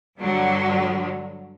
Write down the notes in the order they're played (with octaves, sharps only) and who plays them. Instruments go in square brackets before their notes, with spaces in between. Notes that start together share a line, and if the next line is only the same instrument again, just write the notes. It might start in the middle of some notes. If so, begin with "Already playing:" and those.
[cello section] G2 D3 F#3